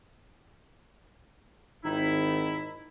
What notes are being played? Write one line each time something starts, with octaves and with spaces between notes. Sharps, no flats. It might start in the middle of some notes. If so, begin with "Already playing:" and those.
G#1 D#3 D#4 E4